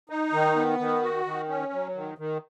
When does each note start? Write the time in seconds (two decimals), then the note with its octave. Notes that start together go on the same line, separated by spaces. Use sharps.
0.10 D#4
0.33 D#3
0.56 B3
0.79 D#3
1.02 F#4
1.25 D#3
1.48 C#4
1.72 F#3
1.95 D#3
2.18 D#3